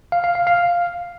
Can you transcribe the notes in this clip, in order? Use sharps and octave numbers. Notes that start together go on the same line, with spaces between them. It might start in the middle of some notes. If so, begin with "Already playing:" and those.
F5
F5
F5
F5